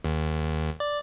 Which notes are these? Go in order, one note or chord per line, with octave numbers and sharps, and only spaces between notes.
D#2
D5